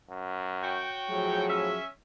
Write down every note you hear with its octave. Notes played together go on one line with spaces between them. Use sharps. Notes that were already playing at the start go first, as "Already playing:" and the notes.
F#2
F#4 C#5 G5
A2 F3 F#3 G#4
C#4 E5